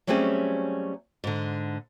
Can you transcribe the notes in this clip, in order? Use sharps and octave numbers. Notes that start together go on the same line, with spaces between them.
F#3 G3 A3 C4 C#4 G#4
G#2 D3